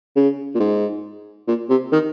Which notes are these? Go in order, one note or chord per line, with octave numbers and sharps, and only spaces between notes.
C#3
A#2
G#2
A#2
C3
D#3